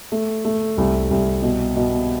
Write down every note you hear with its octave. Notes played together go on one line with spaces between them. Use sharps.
A3
A3
C2
C2
B2
B2